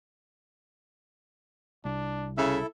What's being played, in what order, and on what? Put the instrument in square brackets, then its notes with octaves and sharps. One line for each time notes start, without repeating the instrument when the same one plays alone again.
[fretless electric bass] C2 [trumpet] D4
[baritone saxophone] C#3 [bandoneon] E4 A4 [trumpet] E5